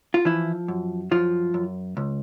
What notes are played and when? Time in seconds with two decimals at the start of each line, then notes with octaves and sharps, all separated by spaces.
0.14 F4
0.25 E3 F3 E4
0.68 F#2
1.11 F#2 F3 F4
1.54 F#2
1.97 C#2